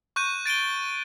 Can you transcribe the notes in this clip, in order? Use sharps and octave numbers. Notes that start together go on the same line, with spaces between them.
C#6 F#6 G6 D#7
A6 D7 D#7 G7